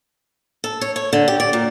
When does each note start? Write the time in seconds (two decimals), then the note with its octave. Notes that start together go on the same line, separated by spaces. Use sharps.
0.64 A4
0.81 C#5
0.96 C#5
1.13 D3
1.28 G4
1.40 D5
1.53 A#2